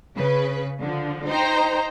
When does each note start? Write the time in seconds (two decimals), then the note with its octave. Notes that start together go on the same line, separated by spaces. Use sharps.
0.16 C#3 B4
0.81 D3 F3
1.28 D#4 C5 G5 A#5